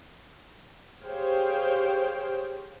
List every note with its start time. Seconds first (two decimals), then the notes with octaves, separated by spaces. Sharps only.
1.04 G4 G#4 C5 C#5 F5 G5